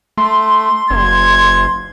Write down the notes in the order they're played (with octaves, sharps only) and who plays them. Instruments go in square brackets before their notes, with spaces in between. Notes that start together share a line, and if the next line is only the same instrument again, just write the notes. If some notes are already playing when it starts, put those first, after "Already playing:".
[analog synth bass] A3 [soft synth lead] C6
[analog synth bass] F#1 [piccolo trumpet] G#6